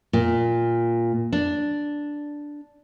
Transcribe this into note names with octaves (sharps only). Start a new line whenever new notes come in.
A#2
D4